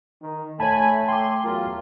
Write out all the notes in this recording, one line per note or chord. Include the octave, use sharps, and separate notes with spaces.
D#3
A3 C#5 G#5 A5 B5
G5 C6 D6
E2 F#3 F4 A#4